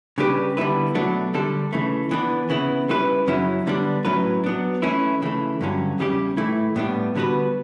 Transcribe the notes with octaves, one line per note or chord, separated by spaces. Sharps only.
C#3 G3 D4 G4 B4
D3 G3 B3 E4 B4
B2 F#3 A3 D4
D3 G3 D4 A4
C#3 E3 A3
E3 B3 D4
C#3 E3 B3 E4
G3 C#4 E4 B4
F#2 C#3 F#3 C#4 E4
D3 G3 B3 D4
A2 F#3 C#4 E4 B4
F#3 B3 D4
E3 A3 C#4 E4
C#3 E3 A3
G2 D3 F#3 C#4
E2 C#3 G3 C#4 G4
A2 E3 A3 E4
A2 G3 B3 D4
D3 G3 B3 F#4 B4